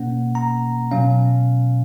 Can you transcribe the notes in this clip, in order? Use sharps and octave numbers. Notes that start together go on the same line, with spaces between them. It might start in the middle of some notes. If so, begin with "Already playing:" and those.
Already playing: B2 A#3 C#4 F#5
A#5
B2 F#3 C#4 F5